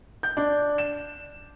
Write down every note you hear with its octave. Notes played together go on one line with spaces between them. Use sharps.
G6
D4
E7